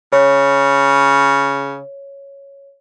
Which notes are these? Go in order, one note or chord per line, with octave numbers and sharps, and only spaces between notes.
C#3 C#5